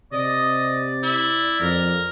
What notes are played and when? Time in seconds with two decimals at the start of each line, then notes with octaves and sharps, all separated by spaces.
0.12 C3 D5 D#5
1.03 E4
1.60 F2 A#4